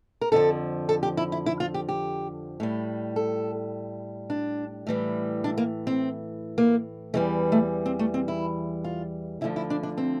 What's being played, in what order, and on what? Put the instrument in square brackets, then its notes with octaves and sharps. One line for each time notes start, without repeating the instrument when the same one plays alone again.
[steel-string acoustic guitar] A#4
F2 D3 F3 A4
A4
G4
E4
E4
E4
F4
G4
G4
A2 G3
A4
D4
A2 E3 G3
D4
A#3
C4
A#3
E2 E3 G3 A3
A3
C4
A3
C4
E4
F4
D2 D3 F3 E4
E4
D4
D4
C4